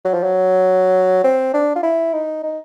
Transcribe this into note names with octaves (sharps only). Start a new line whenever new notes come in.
F#3
F3
F#3
C4
D4
F4
E4
D#4
D#4